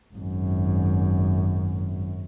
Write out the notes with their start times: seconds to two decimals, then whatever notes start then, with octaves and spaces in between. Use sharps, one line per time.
0.14 G#1 F#2